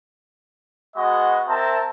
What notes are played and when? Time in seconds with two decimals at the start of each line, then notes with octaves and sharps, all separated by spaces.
0.96 G#3 B3 F#4 D#5 F#5
1.48 C4 A#4 E5 A5